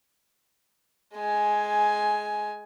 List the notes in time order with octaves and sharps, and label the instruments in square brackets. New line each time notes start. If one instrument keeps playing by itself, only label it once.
[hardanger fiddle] G#3 G#5